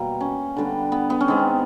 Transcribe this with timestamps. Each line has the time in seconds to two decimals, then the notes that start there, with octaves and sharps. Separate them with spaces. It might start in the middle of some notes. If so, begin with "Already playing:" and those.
Already playing: B2 G3 A#3
0.20 C#4
0.56 D3 G3 B3
0.92 B3
1.10 B3
1.21 C#4
1.28 D#3 G#3 B3 C4